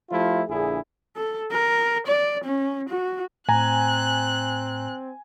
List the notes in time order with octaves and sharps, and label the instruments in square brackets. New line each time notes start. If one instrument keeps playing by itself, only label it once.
[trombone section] F3 A3 E4 F4 G4
A#1 D3 E4 G#4
[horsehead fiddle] A4
A#4
D5
C#4
F#4
[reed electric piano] A2 A#5 [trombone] C4 [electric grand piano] G#5 [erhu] F#6